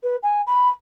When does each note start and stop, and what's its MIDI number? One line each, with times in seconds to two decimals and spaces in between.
0.03 0.16 71
0.22 0.41 80
0.46 0.69 83